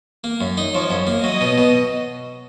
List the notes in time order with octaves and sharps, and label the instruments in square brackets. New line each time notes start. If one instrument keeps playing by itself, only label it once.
[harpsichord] A#3
F#2
D#4
[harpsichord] F3 [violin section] C#5
[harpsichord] F#2
A#3
[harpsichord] F#3 [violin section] D#5
[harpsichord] B2
B2